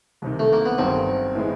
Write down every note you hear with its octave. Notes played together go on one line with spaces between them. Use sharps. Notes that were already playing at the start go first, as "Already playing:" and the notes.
C2 C3 D#3
A3
A#3
B3
G1 G2 D#3 F#3 C4
A2 E3 G#3 B3